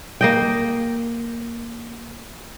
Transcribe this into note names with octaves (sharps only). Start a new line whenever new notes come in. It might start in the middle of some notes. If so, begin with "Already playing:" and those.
A#3 D#5 G5